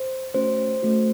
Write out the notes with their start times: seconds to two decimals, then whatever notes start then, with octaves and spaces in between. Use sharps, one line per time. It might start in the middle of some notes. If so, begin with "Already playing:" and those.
Already playing: C5
0.34 A3 C#4 F#4 C5
0.82 A3 C#4 F#4